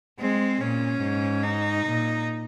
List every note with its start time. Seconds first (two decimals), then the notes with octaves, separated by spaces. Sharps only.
0.19 G#3 C4
0.61 A#2 C#4
1.02 G#2
1.43 D#4
1.85 A#2